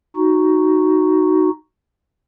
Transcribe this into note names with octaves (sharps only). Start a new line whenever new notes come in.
D#4 F#4